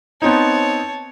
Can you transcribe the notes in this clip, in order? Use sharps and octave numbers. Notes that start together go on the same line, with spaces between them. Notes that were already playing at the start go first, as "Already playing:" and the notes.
B3 C4 D#4 C#5 A5